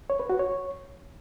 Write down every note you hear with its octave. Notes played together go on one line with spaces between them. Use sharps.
C#5
B4
F#4
C#5